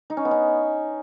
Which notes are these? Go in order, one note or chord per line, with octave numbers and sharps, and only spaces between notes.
D#4
C#4
B3
C#4